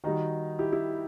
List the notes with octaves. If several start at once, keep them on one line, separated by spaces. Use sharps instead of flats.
D#3 G3 D#4 F#4
E4 G4
E4 G4